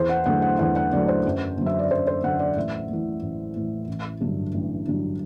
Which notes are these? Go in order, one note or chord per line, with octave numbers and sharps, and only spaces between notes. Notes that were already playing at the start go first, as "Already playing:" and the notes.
Already playing: E2 C5
F#5
D3 F#3 A3 F#5
F#5
E2 F#5
F#5
D3 F#3 A3 D5
C5
F#2
D3 F#3
E5
D5
F#2 C5
C5
D3 F#3 F#5
D5
A1 E5
A2 E3
A1
A2 E3
A1
G2 D3 F#3
A1
G2 D3 F#3